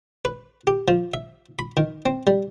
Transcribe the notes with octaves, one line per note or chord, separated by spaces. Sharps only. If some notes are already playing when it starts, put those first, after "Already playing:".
B4
G4
F3
E5
B5
D#3
C4
G3